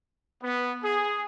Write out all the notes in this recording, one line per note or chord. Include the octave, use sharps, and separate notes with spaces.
B3
G#4